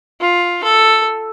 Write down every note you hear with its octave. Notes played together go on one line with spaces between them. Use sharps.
F4
A4